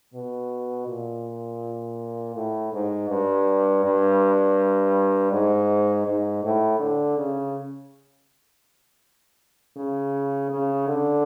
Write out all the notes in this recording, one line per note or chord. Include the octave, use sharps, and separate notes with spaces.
B2
A#2
A2
G#2
G2
G2
G#2
G#2
A2
D3
C#3
C#3
C#3
D3